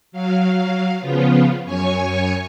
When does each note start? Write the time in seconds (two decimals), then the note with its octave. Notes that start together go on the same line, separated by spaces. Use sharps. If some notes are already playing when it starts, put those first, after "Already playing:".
0.12 F#3 F5
0.99 C#3 F3 B3 F4
1.65 F#2 C#5 G#5 C#6